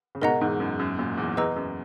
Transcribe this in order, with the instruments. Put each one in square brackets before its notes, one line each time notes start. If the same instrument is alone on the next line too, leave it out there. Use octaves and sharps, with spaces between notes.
[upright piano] C#3
[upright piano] G#2 B2 [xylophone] A#4 D#5 F#5 A#5
[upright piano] E2 G#2
F#2
F#2
F#2 A#2
E2
[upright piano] E2 [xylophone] B4 D#5 A#5 E6
[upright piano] F#2